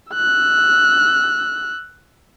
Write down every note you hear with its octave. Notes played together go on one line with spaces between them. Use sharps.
E6 F#6